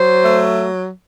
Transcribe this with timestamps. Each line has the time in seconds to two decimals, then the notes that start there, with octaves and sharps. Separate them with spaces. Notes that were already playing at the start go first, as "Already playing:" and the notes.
Already playing: F#3 C5
0.25 A3